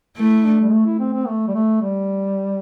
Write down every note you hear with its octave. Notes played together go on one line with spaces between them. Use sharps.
A3 E4
D4
G3
A3
E4
C4
C4
A3
G3
A3
G3